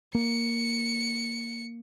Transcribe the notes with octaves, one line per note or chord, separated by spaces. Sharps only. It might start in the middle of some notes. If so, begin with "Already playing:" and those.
A#3 C#7